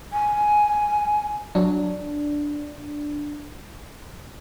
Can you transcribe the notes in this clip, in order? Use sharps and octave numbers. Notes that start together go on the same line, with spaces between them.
G#5
F#3 D4